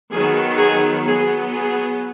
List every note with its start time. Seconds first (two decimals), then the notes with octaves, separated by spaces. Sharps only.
0.11 D#3 F#3 B3 G#4
0.58 G#4
1.05 F#3 B3 G#4
1.53 G#4